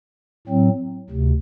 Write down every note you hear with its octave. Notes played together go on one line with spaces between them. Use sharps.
A2 F#3 C4
D2 C3